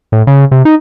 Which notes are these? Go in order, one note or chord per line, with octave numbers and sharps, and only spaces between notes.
A2
C#3
C3
D#4